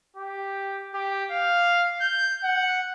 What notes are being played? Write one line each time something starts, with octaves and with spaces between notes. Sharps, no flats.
G4
G4
F5
G6
F#5